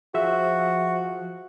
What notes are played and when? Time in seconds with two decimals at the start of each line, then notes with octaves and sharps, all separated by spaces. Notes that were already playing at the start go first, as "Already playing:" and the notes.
0.14 F3 F#4 G#4 C5 E5